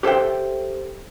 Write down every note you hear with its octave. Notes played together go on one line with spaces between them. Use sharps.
G4 A4 C5 E5 G5